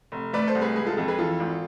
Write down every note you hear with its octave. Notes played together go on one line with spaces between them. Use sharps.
F1
A3 B4 D5
A4 C5
C2
G#4 B4
G#3 G#4 B4
F4 A4
F2 F4 A4
G#4 B4
E3 F4 A4
G#1